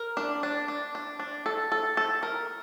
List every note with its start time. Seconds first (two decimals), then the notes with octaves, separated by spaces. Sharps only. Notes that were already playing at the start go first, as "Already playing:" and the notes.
Already playing: A#4
0.17 D4
0.43 D4
0.68 D4
0.95 D4
1.20 D4
1.46 A4
1.72 A4
1.97 A4
2.23 A#4